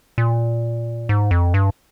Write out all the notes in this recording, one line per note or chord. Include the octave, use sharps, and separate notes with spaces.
A#2
G#2
F2
G2